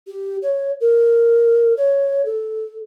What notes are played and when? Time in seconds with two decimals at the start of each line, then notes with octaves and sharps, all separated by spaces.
0.07 G4
0.42 C#5
0.81 A#4
1.77 C#5
2.25 A4